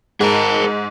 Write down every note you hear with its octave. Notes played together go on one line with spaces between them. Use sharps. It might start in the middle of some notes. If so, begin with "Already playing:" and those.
G#2 G#4 A#4